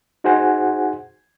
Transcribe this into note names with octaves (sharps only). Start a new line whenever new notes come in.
D#4 F#4 G#4 C5 F#5 G#5